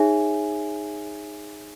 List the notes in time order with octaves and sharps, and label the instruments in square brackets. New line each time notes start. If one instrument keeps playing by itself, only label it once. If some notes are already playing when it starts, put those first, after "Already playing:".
Already playing: [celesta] D#4 G#4 C#5 E5 G#5